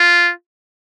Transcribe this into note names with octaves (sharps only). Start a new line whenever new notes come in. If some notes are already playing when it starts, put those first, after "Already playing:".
Already playing: F4